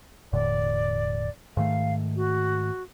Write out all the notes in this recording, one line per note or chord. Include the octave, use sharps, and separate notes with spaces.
E1 A2 D3 D5
G#2 D#3 A3 F5
F#4